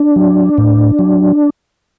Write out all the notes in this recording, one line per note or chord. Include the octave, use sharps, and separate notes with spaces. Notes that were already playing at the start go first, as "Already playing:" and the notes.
Already playing: D4
F#3
A2
F#3